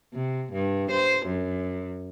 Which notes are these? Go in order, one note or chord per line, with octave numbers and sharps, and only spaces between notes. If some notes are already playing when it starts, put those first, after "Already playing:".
C3
G2
C5
F#2